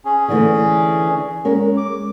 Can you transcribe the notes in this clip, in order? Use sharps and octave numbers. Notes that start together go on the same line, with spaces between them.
C#4 G#4
D3 E3 A3
G#3 C#4 A#4
D6